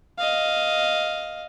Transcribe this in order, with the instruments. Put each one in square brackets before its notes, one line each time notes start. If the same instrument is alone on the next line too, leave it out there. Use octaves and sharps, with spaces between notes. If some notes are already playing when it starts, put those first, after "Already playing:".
[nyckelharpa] D#5 F5